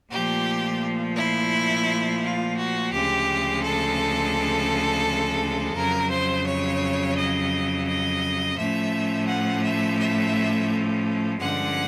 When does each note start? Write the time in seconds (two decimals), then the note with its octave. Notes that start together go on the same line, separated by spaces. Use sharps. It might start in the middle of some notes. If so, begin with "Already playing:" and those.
0.11 A#2 F3 A3 G4
1.17 E4
2.23 F4
2.58 F#4
2.93 D2 C#3 F3 G#3 G4
3.63 A4
5.75 F2 C#3 F#3 A#4
6.10 C5
6.46 C#5
7.17 D#5
7.87 D#5
8.57 A2 F3 A3 C#4 E5
9.28 F#5
9.64 E5
9.98 E5
11.40 G2 D3 F3 G#3 C#4 F#5